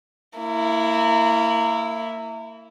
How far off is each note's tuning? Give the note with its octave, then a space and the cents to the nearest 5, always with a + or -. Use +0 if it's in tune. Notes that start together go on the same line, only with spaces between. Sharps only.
A#3 -30 E4 +0